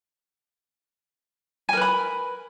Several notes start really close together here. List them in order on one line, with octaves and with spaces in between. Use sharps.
G#5 A#4 B4 B5